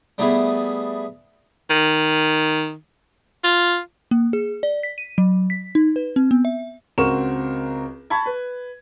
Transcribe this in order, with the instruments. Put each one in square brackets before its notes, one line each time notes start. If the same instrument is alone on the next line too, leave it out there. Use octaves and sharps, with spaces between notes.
[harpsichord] G3 A3 B3 E4 G#4
[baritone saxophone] D#3
F4
[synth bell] A#3
G#4
D5
B6
D#7
F#3
B6
D#4
B4
C4
B3
E5
[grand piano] C#2 C4 F#4 A#4 C#6 E7
A5 B5 C#6 G#6
B4